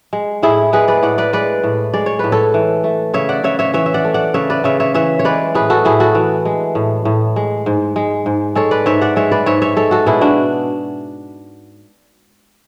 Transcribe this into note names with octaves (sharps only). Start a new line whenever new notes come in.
G#3
A2 E4 G#4
G#3 G#4 B4
B4 D5
A2 D5 F#5
B4 D5
G#3 B4 D5
A2
G#3 D5
C#5
A2 B4
A4 C#5
E3
A3
C#3 C#5 E5
D5 F#5
C#3 C#5 E5
C#5 E5
E3 C#5 E5
E5
D5 F#5
A3
D5 F#5
C#3 C#5 E5
B4 D5
C#3 C#5 E5
C#5 E5
E3 C#5 E5
C#5
G#3 B4 D5
A2 G#4 B4
F#4 A4
A2 E4 G#4
F#4 A4
E3
G#3
A2
A2
G#3
G#2
G#3
G#2
G#3 A4 C#5
B4 D5
G#2 C#5 E5
D5 F#5
G#3 C#5 E5
B4 D5
G#2 C#5 E5
C#5 E5
G#3 A4 C#5
F#4 A4
B2 E4 G#4
D4 F#4